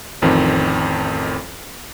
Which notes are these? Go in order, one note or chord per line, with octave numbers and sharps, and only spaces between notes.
A1 F2 D#3 C4